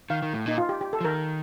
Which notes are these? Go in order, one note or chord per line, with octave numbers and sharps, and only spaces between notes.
D#3 F5
D#3
A2
A#2 D#4
F4
G4
G4
A4
F3
D#3 A#4